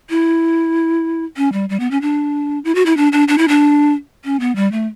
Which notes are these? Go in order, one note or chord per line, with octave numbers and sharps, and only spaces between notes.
E4
C#4
G3
G3
B3
C#4
D4
E4
F#4
E4
D4
D4
D4
E4
D4
C#4
B3
G3
A3